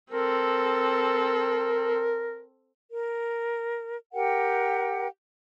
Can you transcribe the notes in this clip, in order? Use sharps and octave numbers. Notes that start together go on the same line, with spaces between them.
C4 A4 A#4
A#4
G4 A#4 F#5 G5